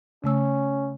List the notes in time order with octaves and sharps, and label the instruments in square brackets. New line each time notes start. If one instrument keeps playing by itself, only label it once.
[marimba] C#3 A3 E6 [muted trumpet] C#4